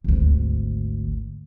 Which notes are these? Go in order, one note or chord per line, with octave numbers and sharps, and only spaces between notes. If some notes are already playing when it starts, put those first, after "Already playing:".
G#1 D2